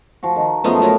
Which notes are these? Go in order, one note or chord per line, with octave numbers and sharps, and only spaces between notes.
F3 F#4
D#3 A#4
F#2 F3 G#3 A3 B3
F#3 B3 A#4